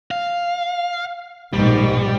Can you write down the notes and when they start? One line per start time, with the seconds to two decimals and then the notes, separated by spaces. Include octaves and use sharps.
0.11 F5
1.54 A#1 G#2 B2 G3 D#4